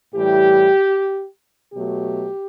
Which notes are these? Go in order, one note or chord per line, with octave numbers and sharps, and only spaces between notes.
A2 E3 G3 G4
B2 F#3 A3 G4